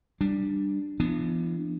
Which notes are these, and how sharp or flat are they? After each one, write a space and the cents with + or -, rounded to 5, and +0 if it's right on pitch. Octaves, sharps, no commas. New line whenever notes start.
G3 +0 D4 +10
E3 +40 B3 +0 D4 +15